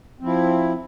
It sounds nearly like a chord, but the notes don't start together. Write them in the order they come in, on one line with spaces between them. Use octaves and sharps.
C4 F3 E4